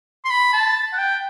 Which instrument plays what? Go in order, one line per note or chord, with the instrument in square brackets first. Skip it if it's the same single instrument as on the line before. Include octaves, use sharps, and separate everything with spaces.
[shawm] C6
B5
A5
F#5
G5